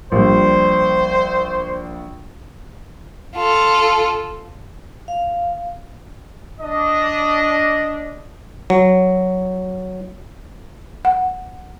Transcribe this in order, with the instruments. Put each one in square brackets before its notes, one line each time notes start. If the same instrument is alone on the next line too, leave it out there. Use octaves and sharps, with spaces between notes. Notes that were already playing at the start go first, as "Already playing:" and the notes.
[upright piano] A#1 G3 [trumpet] C5
[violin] F4 A4
[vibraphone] F5
[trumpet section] D4 D#5
[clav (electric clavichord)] F#3
[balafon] F#5